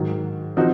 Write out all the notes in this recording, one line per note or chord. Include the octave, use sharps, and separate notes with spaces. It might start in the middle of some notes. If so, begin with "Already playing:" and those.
Already playing: G#2 D#3 F#3
F3 C4 D#4 F#4